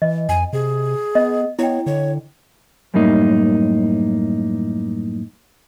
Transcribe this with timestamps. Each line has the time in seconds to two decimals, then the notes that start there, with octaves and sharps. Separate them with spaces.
0.02 E3 D#5
0.29 F2 G#5
0.53 C3 G#4
1.15 B3 D#5
1.59 B3 E4 C#5 G5
1.86 D3 C#5
2.94 F#2 A2 G3 A#3 D#4